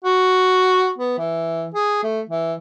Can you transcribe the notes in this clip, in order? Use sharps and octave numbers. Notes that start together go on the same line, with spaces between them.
F#4
B3
E3
G#4
A3
E3